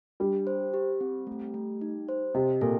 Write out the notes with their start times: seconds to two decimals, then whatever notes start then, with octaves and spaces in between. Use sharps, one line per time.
0.20 G3 D4
0.47 C5
0.74 G4
1.01 C4
1.27 A3
1.54 A3
1.81 D#4
2.09 C5
2.34 C3 D#5
2.61 A#2 A4